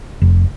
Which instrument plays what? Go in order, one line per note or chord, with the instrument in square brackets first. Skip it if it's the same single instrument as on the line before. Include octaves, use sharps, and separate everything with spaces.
[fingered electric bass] F1